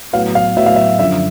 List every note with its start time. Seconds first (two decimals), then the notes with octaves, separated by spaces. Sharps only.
0.13 A2 F#3 B3 F5
0.35 F5
0.57 A2 F#3 B3 E5
0.66 F5
0.76 E5
0.99 F#2 D3 F3 E5